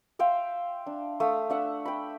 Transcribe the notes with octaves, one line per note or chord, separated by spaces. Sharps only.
E5 F5 G5 C6
D4
A3 F5 D#6
D4 E5 F#5
G5 B5